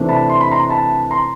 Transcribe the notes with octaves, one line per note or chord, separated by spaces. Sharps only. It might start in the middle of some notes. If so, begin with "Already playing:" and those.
Already playing: C3 E3 A3 D4
A5 B5
C6
B5
A#5 C6
A5 B5
A#5 C6